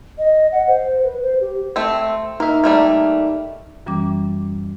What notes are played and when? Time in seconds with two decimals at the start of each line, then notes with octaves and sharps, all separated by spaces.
0.18 D#5
0.52 F#5
0.67 C5
1.04 B4
1.22 C5
1.40 G4
1.76 A3 C4
2.40 A#3 D#4 E5
2.64 G3 A3 A#3
3.86 F#2 E3 G3 C#4 D6